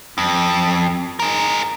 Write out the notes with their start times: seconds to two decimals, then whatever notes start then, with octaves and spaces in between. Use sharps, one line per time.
0.18 F2
1.20 G#4 A#4